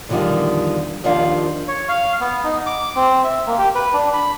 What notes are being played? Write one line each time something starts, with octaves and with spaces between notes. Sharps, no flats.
E2 D3 D#3 F3 G3
D#2 D#3 F3 D4 F5
C#5
F5
B3
D#4
D6
C4
E5
A#3
G4
B4
D4
B5